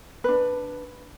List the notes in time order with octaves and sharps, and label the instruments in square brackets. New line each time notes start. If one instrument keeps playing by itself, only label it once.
[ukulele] D4 B4